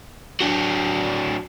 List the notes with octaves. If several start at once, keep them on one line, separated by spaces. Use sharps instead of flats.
F#3 D4